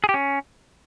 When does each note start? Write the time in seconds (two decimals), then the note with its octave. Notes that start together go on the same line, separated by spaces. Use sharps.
0.04 G#4
0.09 G4
0.14 C#4